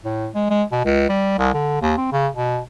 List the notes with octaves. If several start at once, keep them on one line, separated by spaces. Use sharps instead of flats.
A2
G#3
G#3
B2
C#2
G3
C2
D3
D#2
C4
C#3
B2